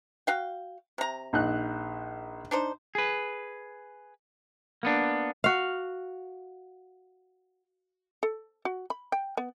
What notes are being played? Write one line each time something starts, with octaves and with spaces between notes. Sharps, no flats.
F#4 F5 G5
C3 A#5
A#1 D#4 F#6
D4 D#4 C5
G#4 B4
A#3 B3 D4
F#4 F5
A4
F#4
B5
G5
B3